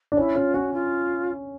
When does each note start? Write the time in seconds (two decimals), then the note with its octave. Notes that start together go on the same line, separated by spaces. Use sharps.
0.12 D4
0.17 C#4 E4
0.36 C#4 F4
0.54 C#4 F#4
0.73 F4